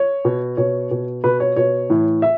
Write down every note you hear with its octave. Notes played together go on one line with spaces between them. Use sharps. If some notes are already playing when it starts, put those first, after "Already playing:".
Already playing: C#5
B2
B2 C#5
B2
B2 B4
C#5
B2 C#5
A2 E3
E5